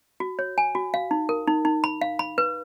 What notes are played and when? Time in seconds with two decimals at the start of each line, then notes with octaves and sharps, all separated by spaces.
0.20 F#4
0.39 C#5
0.58 G#5
0.75 F#4
0.94 F5
1.11 D#4
1.29 A#4
1.47 D#4
1.65 D#4
1.84 B5
2.02 F5
2.19 B5
2.38 B4